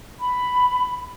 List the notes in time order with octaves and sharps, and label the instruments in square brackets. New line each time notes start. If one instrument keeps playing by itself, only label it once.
[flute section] B5